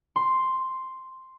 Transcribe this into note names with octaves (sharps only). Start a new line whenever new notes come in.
C6